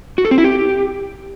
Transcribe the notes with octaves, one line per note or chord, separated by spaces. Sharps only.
F#4
A4
C4
E4
G4